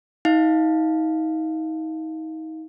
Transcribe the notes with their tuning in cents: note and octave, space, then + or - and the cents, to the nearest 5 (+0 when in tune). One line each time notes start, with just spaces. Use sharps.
D#4 +35 F5 +0